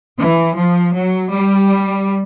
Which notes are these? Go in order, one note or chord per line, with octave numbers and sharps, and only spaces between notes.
E3
F3
F#3
G3